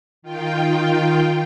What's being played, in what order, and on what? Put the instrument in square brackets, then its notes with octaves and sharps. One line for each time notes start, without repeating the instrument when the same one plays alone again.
[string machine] D#3 F4 G5